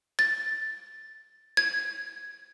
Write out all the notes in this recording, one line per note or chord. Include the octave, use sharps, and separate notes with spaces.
A6
G#6